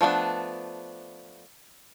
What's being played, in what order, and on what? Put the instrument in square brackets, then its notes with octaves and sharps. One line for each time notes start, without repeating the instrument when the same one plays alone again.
[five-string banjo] F3 A3 B3 D4